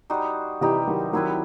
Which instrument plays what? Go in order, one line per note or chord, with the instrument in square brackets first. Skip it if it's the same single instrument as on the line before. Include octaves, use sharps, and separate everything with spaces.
[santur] G3 D#4 F#4 C5
[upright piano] C3 E3 [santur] G3 D#4 G4
[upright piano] D#3 F#3
[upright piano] D#3 F#3 [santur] C4 E4 B4